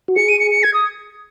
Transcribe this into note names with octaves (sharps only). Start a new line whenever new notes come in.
F#4
G#4 C#7
D#7
C#7
C#7
G#6
D#6